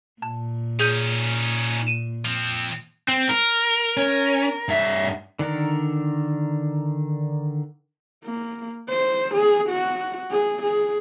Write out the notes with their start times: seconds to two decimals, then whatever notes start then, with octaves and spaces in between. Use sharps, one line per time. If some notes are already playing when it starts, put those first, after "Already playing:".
0.22 A#2 A5
0.79 C#4 D#4 G#4 G6 D#7
1.87 D#7 E7
2.25 F3 C4
3.08 C4
3.29 A#4
3.97 C#4
4.68 G2 E5
5.39 D3 D#3 D4 A#4
8.25 A#3
8.89 C5
9.35 G#4
9.69 F#4
10.31 G#4
10.63 G#4